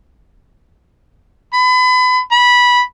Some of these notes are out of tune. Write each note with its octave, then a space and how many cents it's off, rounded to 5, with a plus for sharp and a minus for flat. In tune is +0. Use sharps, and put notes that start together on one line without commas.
B5 +30
B5 -15